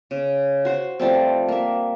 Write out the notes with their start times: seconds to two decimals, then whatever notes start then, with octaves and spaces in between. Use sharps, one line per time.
0.11 C#3
0.65 F#4 C5
0.99 F3 G3 A3 C4
1.48 A#3 E5